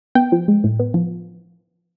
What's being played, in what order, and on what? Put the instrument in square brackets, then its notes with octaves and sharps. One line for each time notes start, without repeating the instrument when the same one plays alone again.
[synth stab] B3 G5
F3
G#3
A2
B3
F3